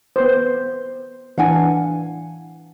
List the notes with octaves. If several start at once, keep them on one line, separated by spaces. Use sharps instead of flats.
B3 B4 C5
E3 D4 F5 F#5 G#5